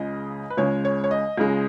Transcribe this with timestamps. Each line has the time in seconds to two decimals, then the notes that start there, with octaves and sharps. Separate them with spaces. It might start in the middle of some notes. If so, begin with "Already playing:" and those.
Already playing: C#2 C#3 G#3 D#5
0.50 B4
0.57 C#2 C#3 G#3 C#5
0.85 C#5
1.04 C#5
1.11 D#5
1.37 C#2 C#3 G#3